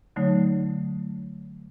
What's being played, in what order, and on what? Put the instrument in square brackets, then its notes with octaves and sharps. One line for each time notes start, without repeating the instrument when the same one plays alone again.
[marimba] D3 F#3 A3 D#4 C#5